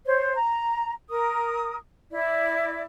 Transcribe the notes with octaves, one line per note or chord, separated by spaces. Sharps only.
C5 C#5
A#5
A#4 D#6
E4 D5